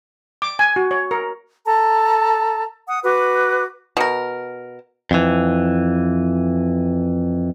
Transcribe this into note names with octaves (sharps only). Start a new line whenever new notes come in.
D6
G#5
F#4
C#5
A#4
A4 A5 A#5
F#5 D#6
F#4 B4 D6
B2 A#4
F2 E3